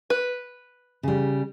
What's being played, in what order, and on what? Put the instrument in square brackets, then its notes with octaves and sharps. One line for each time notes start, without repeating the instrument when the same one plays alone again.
[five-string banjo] B4
[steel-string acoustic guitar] C#3 G3